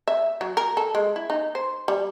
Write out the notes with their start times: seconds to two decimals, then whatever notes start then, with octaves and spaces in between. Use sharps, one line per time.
0.07 E5
0.41 F#3
0.57 A#4
0.77 A4
0.95 G#3
1.16 E4
1.30 D#4
1.55 C5
1.88 G3